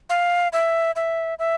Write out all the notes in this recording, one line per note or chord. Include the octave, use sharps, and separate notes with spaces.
F5
E5
E5
E5